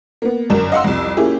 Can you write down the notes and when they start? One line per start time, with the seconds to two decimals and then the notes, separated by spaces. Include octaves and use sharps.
0.22 A#3 B3
0.50 G1 F#2 A#4 E7
0.72 D#5 F5 F#5 C6 E6
0.84 C2 F2
1.17 A#3 C#4 E4 F4 G4 G#4